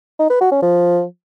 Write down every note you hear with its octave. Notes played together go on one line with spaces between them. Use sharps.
D#4
B4
F#4
C#4
F3